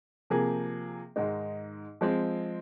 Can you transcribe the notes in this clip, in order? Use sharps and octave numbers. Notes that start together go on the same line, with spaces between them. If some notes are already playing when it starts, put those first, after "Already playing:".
C3 F3 A#3 G#4
G#2 D#3 G#3 D#4
F3 G#3 C4